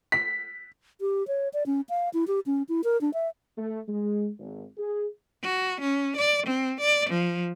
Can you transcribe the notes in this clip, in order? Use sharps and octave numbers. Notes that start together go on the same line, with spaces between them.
B6
G4
C#5
D5
C#4
F5
E4
G4
C#4
E4
A#4
D4
E5
A3
G#3
G#1
G#4
F#4
C#4
D5
C4
D5
F3